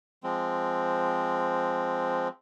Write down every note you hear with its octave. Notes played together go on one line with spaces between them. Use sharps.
F3 G#3 C4